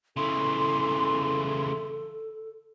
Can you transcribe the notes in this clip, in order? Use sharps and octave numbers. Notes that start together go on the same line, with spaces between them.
C#3 E3 A4 C6